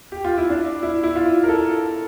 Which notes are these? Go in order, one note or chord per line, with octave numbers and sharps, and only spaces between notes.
G4
F4
E4
D4
E4
E4
F4
A#4
A4